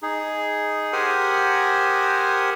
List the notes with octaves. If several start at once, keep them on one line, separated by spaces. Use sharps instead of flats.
D#4 G#4
G4 A#4 C5 F#5 G#5 D#6